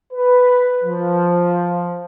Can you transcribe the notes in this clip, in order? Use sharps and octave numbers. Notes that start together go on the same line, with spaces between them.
B4
F3